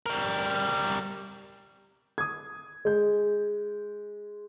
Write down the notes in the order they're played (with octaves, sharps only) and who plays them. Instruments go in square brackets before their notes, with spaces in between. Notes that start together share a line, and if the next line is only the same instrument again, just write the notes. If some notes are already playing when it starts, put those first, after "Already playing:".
[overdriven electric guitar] G3 A#4
[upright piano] D#6 G#6
G#3 G6